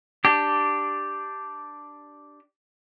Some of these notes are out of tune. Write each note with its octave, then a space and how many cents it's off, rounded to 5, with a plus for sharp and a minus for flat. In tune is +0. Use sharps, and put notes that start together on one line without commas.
D4 +5 G4 -5